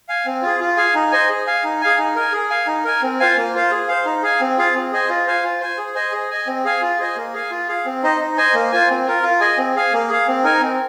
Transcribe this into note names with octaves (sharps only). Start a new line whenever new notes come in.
F5 G#5
C4
F4 G#4
F4
G#4 F5 G#5
D#4
C5 D#5 G#5
G#4
F5 G#5
D#4
G#4 F5 G#5
D#4
A#4 G#5
G#4
F5 G#5
D#4
A#4 G#5
C4
F4 C5 F5 G#5
A#3
F4 C5 F5
G#4
C5 F5
D#4
G#4 F5 G#5
C4
F4 G#4 F5
C4
G#4 C5 D#5 G#5
F4
C5 F5 G#5
F4
C5 G#5
G#4
C5 D#5 G#5
G#4
D#5 G#5
C4
G#4 F5 G#5
F4
G#4 C5 D#5 G#5
A#3
G#4 F5 G#5
F4
G#4 F5
C4
D#4 C5 D#5
D#4
C5 D#5 G#5
A#3
F4 C5 G#5
C4
F4 A#4
F4
G#4 D#5 G#5
C4
G#4 F5 G#5
A#3
G#4 F5
C4
D#4 A#4 G#5
C4